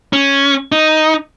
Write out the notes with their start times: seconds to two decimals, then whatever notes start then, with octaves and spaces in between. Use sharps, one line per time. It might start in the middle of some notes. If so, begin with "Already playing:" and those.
0.13 C#4
0.72 D#4